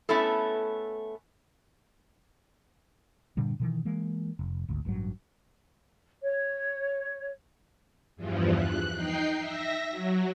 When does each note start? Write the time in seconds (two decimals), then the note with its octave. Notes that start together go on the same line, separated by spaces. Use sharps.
0.09 A3 B3 C#4 E4 A4
3.37 G2 A#2 D3 G3
3.60 B2 D#3 E3
3.85 E3 G#3 A#3
4.39 F1
4.69 G#1 D2
4.85 A1 G2 E3 F#3
6.23 C#5
8.16 E2 G2 E3 F3
8.51 F#6
8.94 D#4 G5 C7
9.37 E5 A#6
9.90 F#3